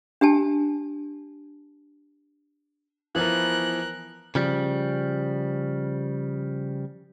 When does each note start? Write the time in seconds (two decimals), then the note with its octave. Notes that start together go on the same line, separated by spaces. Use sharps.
0.21 D4 G4 G#5 A5
3.15 E3 F3 B3 A#4 F#6
4.35 C#3 F3 G3